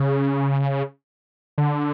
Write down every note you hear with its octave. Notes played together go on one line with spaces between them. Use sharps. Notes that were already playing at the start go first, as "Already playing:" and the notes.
Already playing: C#3
D3